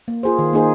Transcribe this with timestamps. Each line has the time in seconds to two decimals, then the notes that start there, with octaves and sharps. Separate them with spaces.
0.08 A#3
0.23 F4 G#4 C5
0.39 D#3
0.53 A#3 D#4 G#4 C5